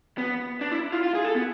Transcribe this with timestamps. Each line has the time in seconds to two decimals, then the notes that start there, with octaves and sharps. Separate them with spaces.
0.18 B3
0.61 D4
0.72 E4
0.92 F4
1.03 F4
1.14 G#4
1.25 A4
1.35 B3